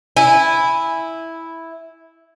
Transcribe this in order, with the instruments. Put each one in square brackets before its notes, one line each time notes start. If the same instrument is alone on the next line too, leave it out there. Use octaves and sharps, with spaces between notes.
[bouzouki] E4 [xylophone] G#5